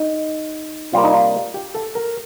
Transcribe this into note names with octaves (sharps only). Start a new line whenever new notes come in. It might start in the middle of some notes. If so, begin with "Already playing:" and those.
Already playing: D#4
C3 G3 A#3 F4
D#4
F4
G4
A4
A#4